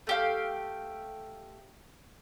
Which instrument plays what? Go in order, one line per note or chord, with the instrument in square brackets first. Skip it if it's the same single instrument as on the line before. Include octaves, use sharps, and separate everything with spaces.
[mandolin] A3 G4 F5